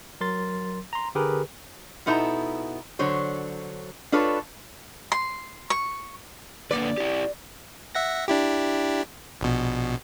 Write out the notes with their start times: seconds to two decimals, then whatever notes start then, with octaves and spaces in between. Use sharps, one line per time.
0.21 F#3 A#4 C6 A6
0.93 A#5 C6
1.15 D3 G4 G#4 A#4 B4
2.06 B2 B3 D#4 E4 A4 A#5
2.99 D3 F#3 C5 C#5
4.12 D4 F4 A4 B4 C#5
5.12 C6
5.70 C#6
6.71 D3 A#3 B4 D5
6.97 E4 G4
7.95 E5 F#5 A#6
8.28 D4 E4 G4
9.41 A#1 B2